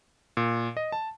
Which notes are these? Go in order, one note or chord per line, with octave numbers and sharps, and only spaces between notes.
A#2
D#5
A5